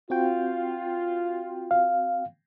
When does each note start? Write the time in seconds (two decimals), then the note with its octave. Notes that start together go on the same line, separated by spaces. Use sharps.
0.10 C4 F4 F#4 G5
1.71 F5